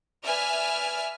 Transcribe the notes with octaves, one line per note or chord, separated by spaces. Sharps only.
B4 D5 E5 G#5 F6